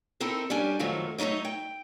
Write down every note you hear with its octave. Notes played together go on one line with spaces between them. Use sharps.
C4 D#4 E4 A4 A#4
G3 C#4 D4 G#5
F#2 D#3 F3 F#3 A3
F#3 A3 D#4 C#5 D#5
G5